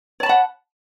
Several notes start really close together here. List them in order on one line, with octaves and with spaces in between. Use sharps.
C#5 A5 B5 F#5